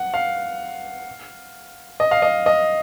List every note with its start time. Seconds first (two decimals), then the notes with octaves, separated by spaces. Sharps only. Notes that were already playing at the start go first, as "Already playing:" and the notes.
Already playing: F#5
0.14 F5
2.00 D#5
2.11 F5
2.22 D#5
2.46 D#5